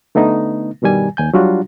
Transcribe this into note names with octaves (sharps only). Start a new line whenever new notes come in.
D3 A3 B3 D#4
G2 B2 D#3 G3 G#5
D#2 G#5 G6
F#3 G3 D4 F4 F#4